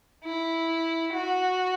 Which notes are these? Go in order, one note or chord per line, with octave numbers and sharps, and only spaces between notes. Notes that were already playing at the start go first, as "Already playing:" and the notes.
E4
F#4